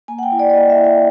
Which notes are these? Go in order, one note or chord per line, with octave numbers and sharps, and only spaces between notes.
A#3 G#5
F#5
G5
E4
D5
D5
A#3 D#5
E5
E4
E5